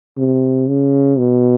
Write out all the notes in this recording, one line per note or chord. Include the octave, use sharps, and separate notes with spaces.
C3
C#3
B2